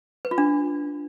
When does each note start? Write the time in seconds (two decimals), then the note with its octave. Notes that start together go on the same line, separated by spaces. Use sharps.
0.25 B4
0.31 F4
0.38 D4